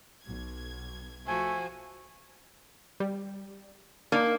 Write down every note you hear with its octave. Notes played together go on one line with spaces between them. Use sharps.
B1 G#6
F3 A3 F#4 C5 G#5
G3
A#3 D4 D#4